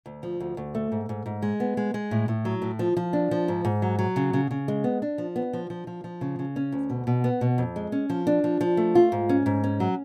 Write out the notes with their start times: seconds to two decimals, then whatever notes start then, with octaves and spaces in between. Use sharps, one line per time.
0.06 D2
0.23 F3
0.40 D2
0.57 D2
0.75 A3
0.92 G#2
1.09 G#2
1.26 G#2
1.42 G#3
1.60 B3
1.77 G#3
1.94 G#3
2.11 A2
2.28 A2
2.45 F#3
2.62 A2
2.79 F3
2.97 F3
3.13 D4
3.31 F3
3.48 G#2
3.65 G#2
3.82 F#3
3.99 F#3
4.16 C#3
4.33 C#3
4.51 C#3
4.68 G#3
4.84 B3
5.02 D4
5.18 F3
5.36 B3
5.53 F3
5.70 F3
5.87 F3
6.04 F3
6.21 C#3
6.39 C#3
6.56 C#4
6.72 D2
6.90 B2
7.07 B2
7.24 B3
7.41 B2
7.58 F2
7.76 G#3
7.92 C#4
8.10 F3
8.27 D4
8.44 F3
8.61 F3
8.77 A3
8.95 F4
9.12 G#2
9.29 C#4
9.46 G#2
9.64 C#4
9.80 F#3